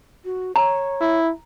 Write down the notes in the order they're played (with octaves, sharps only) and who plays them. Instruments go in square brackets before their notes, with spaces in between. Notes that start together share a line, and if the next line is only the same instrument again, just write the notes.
[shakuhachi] F#4
[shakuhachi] C#5 [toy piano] A#5
[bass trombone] E4